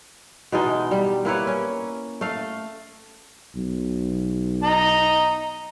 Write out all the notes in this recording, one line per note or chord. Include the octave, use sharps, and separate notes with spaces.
B2 E3 G#3 D#4
G3
A#3 E4 B4 C#5
C#4
A3 F5
B1
D#5 A#5